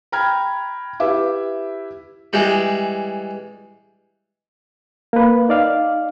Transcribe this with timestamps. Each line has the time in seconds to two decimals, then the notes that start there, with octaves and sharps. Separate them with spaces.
0.12 G5 A#5 B5 F6 G#6
1.00 E4 G4 B4 E5 D6
2.33 E3 G3 G#3
5.13 A#3 B4
5.49 D#4 D5 F5